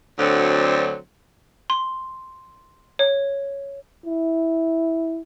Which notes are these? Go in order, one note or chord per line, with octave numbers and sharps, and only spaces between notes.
D2 D3 F#3 C4
C6
C#5
E4